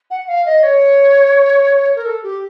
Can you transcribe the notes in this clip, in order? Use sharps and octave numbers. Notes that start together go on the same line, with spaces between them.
F#5
F5
D#5
C#5
A#4
A4
G4